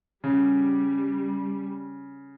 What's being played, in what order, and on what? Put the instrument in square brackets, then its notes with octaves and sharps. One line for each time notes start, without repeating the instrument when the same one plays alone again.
[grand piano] C#3 [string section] G3